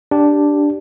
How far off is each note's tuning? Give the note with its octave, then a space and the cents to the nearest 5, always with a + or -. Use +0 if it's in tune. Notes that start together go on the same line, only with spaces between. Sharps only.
D4 +0 G4 +0